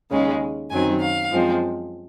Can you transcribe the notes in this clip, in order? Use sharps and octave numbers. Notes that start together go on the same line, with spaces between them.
D#2 C#3 G#3 C#4
F#2 D#3 F#3 C4 G#5
F5
F#2 F3 G#3 C4